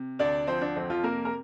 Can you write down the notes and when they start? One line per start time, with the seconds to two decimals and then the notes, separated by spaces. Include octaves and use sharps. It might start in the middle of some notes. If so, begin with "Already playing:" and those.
Already playing: C3
0.19 D2 D4 D5
0.47 F3 C4 C5
0.62 D4
0.76 F2 C4
0.90 F3 F4
1.04 C3 A#3 A#4
1.25 A#4